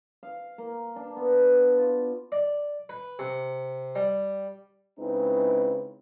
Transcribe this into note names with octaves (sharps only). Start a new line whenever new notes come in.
F5
A#3
D4
B3
F4
D5
B4
C3
G3
C#3 G#3 C4 D#4 E4 B4